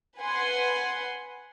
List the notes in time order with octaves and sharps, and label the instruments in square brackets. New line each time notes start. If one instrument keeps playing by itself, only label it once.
[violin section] B4 F#5 G#5 C6